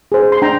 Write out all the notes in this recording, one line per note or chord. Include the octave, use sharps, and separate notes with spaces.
G#4 C5
C6
D4 G5 A#5